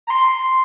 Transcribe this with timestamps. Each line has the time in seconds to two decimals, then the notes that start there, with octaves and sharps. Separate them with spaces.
0.07 A#5
0.10 C6